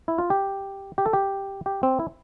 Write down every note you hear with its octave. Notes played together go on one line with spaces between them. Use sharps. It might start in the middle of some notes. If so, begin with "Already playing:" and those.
E4
F4
G4
G4
A4
G4
G4
C4
E4